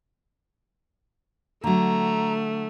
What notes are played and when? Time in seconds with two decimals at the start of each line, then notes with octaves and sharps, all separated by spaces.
1.64 D3 F#3 A3 A#5